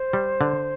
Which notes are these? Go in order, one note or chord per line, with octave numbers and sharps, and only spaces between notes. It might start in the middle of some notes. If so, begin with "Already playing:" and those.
Already playing: C5
G3
D3